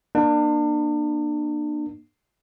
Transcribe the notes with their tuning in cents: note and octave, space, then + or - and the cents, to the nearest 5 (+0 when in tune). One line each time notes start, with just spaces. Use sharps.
A#3 +25 D4 +35